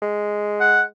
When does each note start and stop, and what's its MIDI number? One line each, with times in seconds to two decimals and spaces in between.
0.02 0.86 56
0.60 0.82 78